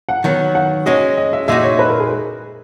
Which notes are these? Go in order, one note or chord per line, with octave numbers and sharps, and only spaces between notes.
F#5
D#3 F#3 B3
F#5
G#3 C#4 F#4 D#5
D#5
E5
A#2 G#3 D#4 F#4 E5
C#5
B4
A#4
G#4